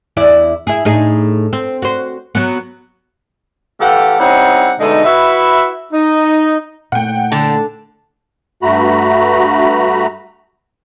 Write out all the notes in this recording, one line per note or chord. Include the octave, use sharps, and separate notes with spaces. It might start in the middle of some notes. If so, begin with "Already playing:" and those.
E2 E4 D5
E4 G#4
A2 D#4 G#4
C4
F#4 C5
F#3 B3
E3 A3 G4 A4 F5 F#5
G3 C4 C#4 D#4 E4 F#5
B2 D3 G#3 A3 D#4
E4 F#4 B4 E5
D#4
A#2 A3 F#5 G5
D3 A5
G2 A3 F#4 A#5 B5